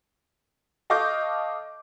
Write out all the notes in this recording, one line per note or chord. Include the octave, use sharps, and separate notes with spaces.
A4 D#5 F5 C#6 D6 G6